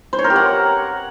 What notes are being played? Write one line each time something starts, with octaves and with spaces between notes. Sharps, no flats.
C5
C#5
A#4
G4
F#5